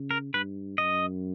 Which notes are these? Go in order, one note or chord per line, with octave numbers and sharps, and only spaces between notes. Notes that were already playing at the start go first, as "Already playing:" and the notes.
Already playing: C#3
A#4
G2 B4
F#2 D#5